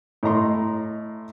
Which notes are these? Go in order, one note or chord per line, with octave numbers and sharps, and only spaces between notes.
A2 D#5 A#5 C6